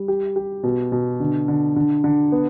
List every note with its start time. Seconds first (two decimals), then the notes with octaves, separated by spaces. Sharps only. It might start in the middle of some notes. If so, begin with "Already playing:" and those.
Already playing: G3
0.08 G4
0.36 G4
0.64 B2
0.92 B2
1.20 D3
1.48 D3
1.76 D3
2.04 D3
2.32 B3